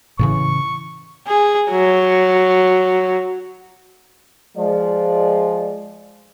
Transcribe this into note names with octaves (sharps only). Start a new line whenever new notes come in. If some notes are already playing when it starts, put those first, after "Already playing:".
A2 C#3 E3 C#6
G#4
F#3
F3 G#3 D5